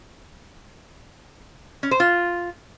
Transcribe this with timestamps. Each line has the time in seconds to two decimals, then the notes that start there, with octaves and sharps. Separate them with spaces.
1.83 C#4
1.91 C5
2.00 F4